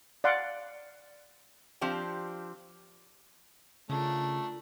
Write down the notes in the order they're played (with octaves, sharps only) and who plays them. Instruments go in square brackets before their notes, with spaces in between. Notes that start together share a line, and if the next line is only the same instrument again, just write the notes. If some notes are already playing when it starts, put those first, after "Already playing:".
[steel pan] D5 F5 F#5 C6 D6
[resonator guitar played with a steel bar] F3 C4 D4 G4
[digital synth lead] C#3 [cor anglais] A3 [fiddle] D4 A#4 [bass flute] F4